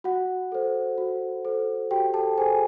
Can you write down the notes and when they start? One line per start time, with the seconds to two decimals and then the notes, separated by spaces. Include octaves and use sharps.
0.04 F#4 F#5
0.52 A4 C5
0.98 F#4
1.45 A4 C5
1.91 F#4 G4 G5
2.14 A4 A5
2.38 G#4 A4 C5 G#5